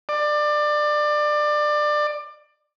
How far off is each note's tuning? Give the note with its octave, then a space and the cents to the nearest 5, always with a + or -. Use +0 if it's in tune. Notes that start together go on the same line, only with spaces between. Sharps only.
D5 +25